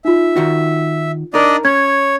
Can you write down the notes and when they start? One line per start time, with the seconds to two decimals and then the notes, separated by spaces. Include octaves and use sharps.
0.05 D#4 F4 E5
0.36 D#3 F#4
1.34 D4 D#4 A#4 D5 D#5
1.65 C#4 C#5 G#6